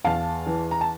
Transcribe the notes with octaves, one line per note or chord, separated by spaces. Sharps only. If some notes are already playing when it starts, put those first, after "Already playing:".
E2 F5 A5
E3
A#5
A5